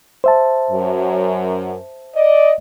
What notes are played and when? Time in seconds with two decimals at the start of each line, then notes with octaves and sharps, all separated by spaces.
0.24 C5 E5 A5
0.71 F#2
2.15 D5 D#5